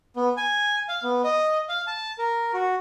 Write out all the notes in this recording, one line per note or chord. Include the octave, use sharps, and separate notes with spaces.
B3
G#5
F5
B3
D#5
F5
A5
A#4
F#4